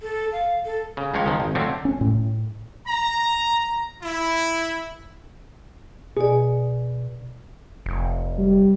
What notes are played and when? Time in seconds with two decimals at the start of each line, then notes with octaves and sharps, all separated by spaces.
0.01 A4
0.32 F5
0.65 A4
0.97 C#3
1.14 C#2 F3 G#3 C#5
1.26 D#3 F3
1.40 G#1
1.55 D3 F3 F#3 A3 C4
1.85 C#4
2.01 A2
2.87 A#5
4.02 E4
6.17 B2 G#4 D5
7.86 F1
8.38 G3